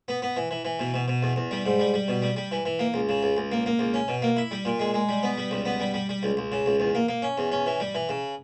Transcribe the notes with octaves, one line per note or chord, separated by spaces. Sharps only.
B3
B3
E3
E3
E3
B2
B2
B2
E2
E2
G3
G#2
G3
G3
B2
G3
G3
E3
E3
A#3
C#2
C#3
C#2
C#2
A#3
A#3
C#2
C#4
B2
A#3
E4
G3
A#2
G#3
G#3
G3
B3
G3
C#2
B3
G3
G3
G3
C#2
C#2
C#3
C#2
E2
A#3
A#3
C#4
E2
C#4
E3
G3
E3
C#3